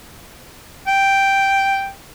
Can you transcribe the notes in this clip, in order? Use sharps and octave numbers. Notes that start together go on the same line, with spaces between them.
G5